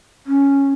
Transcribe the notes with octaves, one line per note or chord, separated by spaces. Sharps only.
C#4